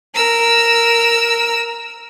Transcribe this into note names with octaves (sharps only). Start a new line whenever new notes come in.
A#4 E6